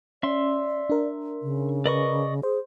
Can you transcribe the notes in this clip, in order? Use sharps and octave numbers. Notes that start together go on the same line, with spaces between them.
C#4 D5 E5 C6
D4 A#4
C#3
A#4 B4 D5 D#5 C#6
G#4 C5